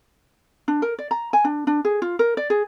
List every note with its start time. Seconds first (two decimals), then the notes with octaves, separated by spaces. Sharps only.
0.68 D4
0.82 A#4
0.99 D5
1.11 A#5
1.33 G#5
1.44 D4
1.67 D4
1.85 G#4
2.02 F4
2.19 A#4
2.37 D5
2.50 G#4